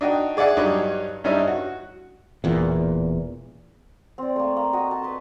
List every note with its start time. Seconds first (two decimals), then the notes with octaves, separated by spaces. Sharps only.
0.01 D4 D#4 F#4 G5
0.37 G#4 D5 E5 F#5 G#5
0.57 G2 F#3 G3 D#4 C#5 D6
1.24 G2 G3 C#4 D#4 E4
1.47 F#4
2.44 E1 E2 A#2
4.18 C4 D5
4.36 A3 A#3
4.56 A#3
4.73 F#4 D#5 G5
4.91 A5
5.02 B4 C6